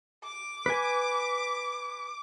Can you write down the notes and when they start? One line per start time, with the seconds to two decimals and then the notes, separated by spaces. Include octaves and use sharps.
0.24 D6
0.66 B4 G#5